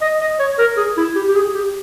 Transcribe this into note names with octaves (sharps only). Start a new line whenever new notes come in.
D#5
D#5
C#5
A#4
G#4
E4
G4
G4
G#4
G4